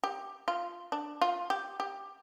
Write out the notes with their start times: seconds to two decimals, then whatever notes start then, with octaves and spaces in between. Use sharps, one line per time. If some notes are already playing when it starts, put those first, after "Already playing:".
0.04 G4
0.48 F4
0.92 D4
1.21 F4
1.50 G4
1.80 G4